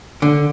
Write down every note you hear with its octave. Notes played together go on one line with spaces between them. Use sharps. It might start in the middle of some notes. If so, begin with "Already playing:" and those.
D3